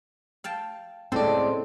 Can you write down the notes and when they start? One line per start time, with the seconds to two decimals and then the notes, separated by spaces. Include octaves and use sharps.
0.44 F5 G5 A5
1.12 A2 C#3 G#3 C4 A4 D5